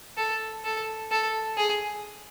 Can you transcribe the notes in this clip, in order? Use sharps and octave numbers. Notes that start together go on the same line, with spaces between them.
A4
A4
A4
G#4